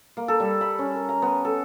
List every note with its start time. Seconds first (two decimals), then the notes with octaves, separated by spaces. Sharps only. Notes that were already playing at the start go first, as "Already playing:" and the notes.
0.17 A#3
0.28 A4
0.40 G3
0.61 B5
0.79 C#4
0.95 A#4
1.09 A#5
1.22 B3
1.45 A4